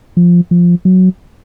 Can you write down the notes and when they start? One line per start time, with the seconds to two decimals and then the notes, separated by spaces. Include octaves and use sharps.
0.17 F3
0.51 F3
0.85 F#3